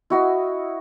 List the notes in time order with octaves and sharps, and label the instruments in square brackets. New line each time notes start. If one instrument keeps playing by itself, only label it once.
[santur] E4 F#4 D#5